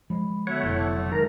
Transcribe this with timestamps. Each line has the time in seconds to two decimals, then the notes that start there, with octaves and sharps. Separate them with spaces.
0.10 F3 G#3 B5
0.47 D3 A3 B3 F#4 C#5 E5 F#5
0.63 F1 B2 E4
0.76 F#3 A5 D6
1.12 D#3 G#3 A#4 A#5